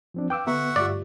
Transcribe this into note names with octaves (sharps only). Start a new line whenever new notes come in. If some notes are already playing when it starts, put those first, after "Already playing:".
F3 C4 D4
B4 F5 G5 D6 E6
D3 B3 F#4 E5 F#5
G2 A3 F4 G4 D5